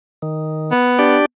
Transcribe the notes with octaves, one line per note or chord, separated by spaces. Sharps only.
D#3
B3
D4 G4 D5